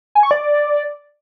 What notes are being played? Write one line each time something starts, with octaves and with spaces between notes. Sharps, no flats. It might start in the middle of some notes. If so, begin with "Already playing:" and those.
G#5
C#6
D5